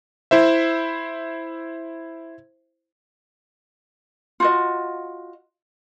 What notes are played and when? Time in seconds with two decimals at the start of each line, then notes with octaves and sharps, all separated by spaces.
0.31 E4 C5 E5
4.40 F4 F#4 D#5